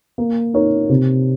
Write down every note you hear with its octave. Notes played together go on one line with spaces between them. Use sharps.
A#3
D#4 A#4 C#5
C3